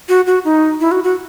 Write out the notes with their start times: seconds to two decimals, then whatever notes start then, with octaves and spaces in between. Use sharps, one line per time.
0.09 F#4
0.27 F#4
0.45 D#4
0.80 E4
0.91 F#4
1.04 F#4